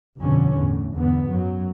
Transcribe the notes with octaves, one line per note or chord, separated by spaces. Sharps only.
G1 F2 B2 D3 C#4
E2 A2
E2 G#2 D3 B3
F#2 F#3